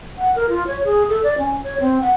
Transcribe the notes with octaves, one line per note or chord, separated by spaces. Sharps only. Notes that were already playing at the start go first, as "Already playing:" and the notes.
F#5
A#4
F4
C#5
G#4
A4
D5
C#4
C#5
C4
F#5